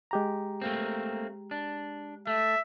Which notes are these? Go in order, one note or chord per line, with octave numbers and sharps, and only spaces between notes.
G#3 G4 A#5
A3 A#3 C4
D4
A3 E5